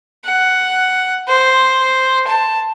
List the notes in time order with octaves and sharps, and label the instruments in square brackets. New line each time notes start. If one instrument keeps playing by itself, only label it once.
[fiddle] F#5
C5
A5